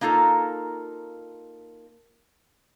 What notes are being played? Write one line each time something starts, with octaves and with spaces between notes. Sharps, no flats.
A#3 D#4 F4 A4 A#4